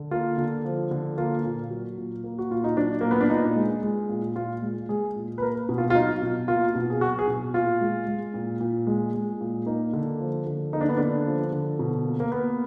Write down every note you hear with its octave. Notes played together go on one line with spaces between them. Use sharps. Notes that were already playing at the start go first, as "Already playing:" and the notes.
Already playing: D3
A#3 F4
D3
F3
D3
A#3 F4
A#2
F#3
A#2
A#3
F#4
A#2 F4
D#4
F#3 D4
A#2 A#3
B3
D4
A#2 D#4
G#3
G#3
A#2
A#2 F4
G#3
G#3 G#4
A#2
B4
A#3 A#4
B2
F4
F4
F#3 D#4
B2
A#3 F4
B2
G#4
F#3 F#4
G#4
B2
A#2 F4
G#3
G#3
A#2
A#2
G#3
G#3
A#2
A#3 D#4
D3
F3
D3
A#3 D#4
D4
B3
D3 D4
F3
D3
B2
A#3
A#3
A#3 B3